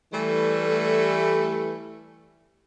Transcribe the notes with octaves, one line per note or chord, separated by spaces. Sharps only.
E3 G3 A3